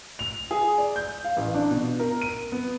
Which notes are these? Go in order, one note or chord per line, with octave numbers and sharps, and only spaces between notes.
F7
G#4
D5
G6
F5
A1
D4
B2
A#4
D#7
B3